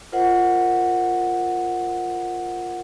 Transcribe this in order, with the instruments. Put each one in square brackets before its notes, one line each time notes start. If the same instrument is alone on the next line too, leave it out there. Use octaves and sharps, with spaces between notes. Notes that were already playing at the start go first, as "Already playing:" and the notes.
[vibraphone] F4 A#4 C5 D#5 F#5